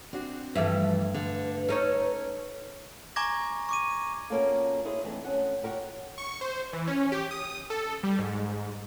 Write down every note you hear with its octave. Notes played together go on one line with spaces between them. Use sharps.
C4 D4 F#4
G2 E3 F3 A3 B4 E5
D3
C#4 D#4 A4 C#5
G#5 A#5 C#6 D6 G#6 A#6
C#6 D6 D#7
B2 A#3 C#4 F4 A4 F5
D#4 E4 G#4 C5 C#5
E3 G#3 A3 C4 D4
D2 C#3 C#4 F#5
F#4 G4 A#4 B4 C#5 F#5
C#6
C5
E3
C#4
G4
D#6
A4
G3
G#2
G#2